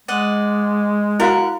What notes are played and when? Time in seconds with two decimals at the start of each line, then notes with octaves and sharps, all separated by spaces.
0.08 G#3 D5 D#5 F#5
1.20 E4 F#4 A#4 F5 F#5